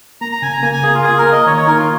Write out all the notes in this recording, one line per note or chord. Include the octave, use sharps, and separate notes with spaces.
A#3 A#5
A#5
C#3 G#5
A#5
A#3 G#5
G#5
A#3 G#4
F4
A#3 G#4
A#4
A#3
D#5
D#3 C#5
C#5
D#4 A#4
F4